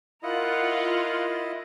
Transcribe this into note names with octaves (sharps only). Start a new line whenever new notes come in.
E4 F4 A#4 D#5 F#5